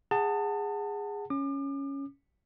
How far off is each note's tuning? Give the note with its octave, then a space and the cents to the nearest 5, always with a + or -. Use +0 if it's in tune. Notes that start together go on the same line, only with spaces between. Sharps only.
G#4 -15 F#5 +0 A5 +25
C#4 +0 D6 +40